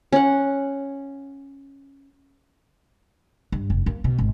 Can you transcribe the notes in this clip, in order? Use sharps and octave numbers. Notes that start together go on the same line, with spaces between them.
C#4 F#5
G2
F1
A#3
B2
G#1